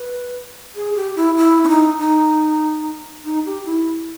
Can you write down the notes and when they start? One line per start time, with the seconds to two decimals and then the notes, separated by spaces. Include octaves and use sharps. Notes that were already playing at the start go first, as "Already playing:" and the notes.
Already playing: B4
0.75 G#4
0.95 G4
1.16 E4
1.37 E4
1.64 C#4
1.68 D#4
1.99 D#4
3.25 D#4
3.46 G4
3.66 E4